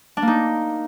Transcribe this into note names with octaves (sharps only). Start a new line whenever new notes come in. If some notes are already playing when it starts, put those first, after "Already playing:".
D4
A#3
D#4